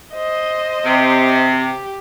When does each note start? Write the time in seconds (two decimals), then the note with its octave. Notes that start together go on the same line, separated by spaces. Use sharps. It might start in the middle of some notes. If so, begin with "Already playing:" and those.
0.14 C5 D#5
0.84 C3
1.52 G4